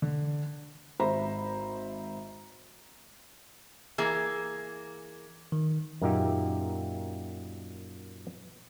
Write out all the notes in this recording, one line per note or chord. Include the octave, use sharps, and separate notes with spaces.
D3
G#1 C5 E5 A#5 B5
E3 A#3 G#4
D#3
F#2 A#2 A#3 D#4 G4 E5